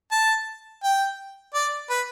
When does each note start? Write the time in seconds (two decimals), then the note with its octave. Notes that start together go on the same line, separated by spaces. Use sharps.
0.12 A5
0.84 G5
1.54 D5
1.90 B4